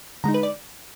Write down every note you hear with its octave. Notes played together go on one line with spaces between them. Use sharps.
D3 G#3 D#4 A#5
B4
D5